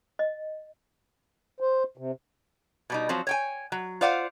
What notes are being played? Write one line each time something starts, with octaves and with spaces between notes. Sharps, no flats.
D#5
C5
C3
B2 G3 D#4
F3 F#3 C4
C#5 G5 G#5
F#3
F4 C5 D5 F5 F#5